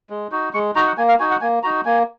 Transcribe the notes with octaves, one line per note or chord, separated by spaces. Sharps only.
G#3
D#4 F#4
G#3 C#6
D#4 F#4 A#5
F#5
A#3 G#5
F5
D#4 F#4 G#5
F#5
A#3 G#5
D#4 F#4 A#5
A#3 G#5